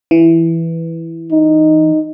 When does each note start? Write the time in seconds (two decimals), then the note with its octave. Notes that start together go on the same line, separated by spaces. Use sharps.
0.11 E3
1.32 D#4